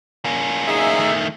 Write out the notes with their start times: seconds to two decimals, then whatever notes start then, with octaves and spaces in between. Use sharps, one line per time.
0.25 A#3 C#4
0.68 D#4 G#4 E5
0.99 D#3 A3